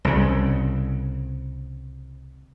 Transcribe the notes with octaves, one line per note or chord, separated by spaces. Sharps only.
C2 C#3